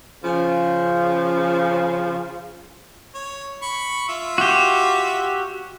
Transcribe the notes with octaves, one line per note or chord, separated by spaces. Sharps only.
C#3 F3
C#5
B5 C#6
F4 E5
F#4 G4